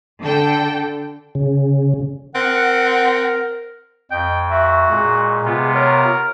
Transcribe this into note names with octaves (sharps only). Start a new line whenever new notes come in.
D3 A4 G5
C#3
C4 A#4 F#5
F2 D#5 G5
F#4 E5
A#2 G#3
C3 B3 F4
A#4 C#5